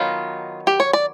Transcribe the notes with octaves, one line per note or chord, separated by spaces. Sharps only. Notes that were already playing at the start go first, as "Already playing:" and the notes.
Already playing: D#3 F#3 B3 D#4 F4
G4
C#5
D5